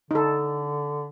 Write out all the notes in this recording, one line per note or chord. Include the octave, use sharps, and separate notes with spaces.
D3 D#4 A4